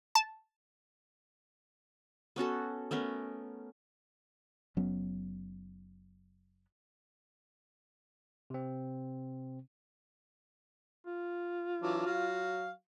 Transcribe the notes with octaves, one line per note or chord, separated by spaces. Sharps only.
A5
B3 C#4 F#4 A4
A3 B3 C#4 A#4
F#1 F#3 B3 C#4
C3 C4
F4
E3 F#3 D4
F#3 F#4 F5